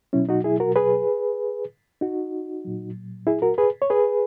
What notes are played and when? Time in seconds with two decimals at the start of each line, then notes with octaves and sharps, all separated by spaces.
0.13 B2 F#3 C#4 E4
0.29 D#4 F#4
0.44 E4 G#4
0.60 F#4 A#4
0.76 G#4 B4
2.01 D#4 F#4
2.65 A#2 F#3
3.27 E4 G#4
3.42 F#4 A#4
3.58 G#4 B4
3.82 C#5
3.90 G#4 B4